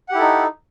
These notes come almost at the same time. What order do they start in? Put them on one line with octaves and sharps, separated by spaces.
F#5 G4 E4 A4 D#4